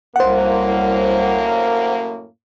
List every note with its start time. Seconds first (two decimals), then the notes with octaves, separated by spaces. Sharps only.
0.16 C2 F#2 A2 A#3 C5 F#5